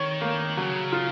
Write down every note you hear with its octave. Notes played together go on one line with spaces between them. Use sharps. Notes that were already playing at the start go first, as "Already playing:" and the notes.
Already playing: D#3 C#5
A#3
C#3 F#3
F4